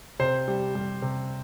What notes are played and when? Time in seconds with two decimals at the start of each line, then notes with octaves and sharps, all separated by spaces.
0.19 C3 C5
0.48 G3
0.75 G3
1.02 C3